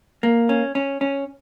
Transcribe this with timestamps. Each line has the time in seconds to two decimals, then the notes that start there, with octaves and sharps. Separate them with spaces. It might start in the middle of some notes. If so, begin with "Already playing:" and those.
0.23 A#3
0.49 C#4
0.75 C#4
1.01 C#4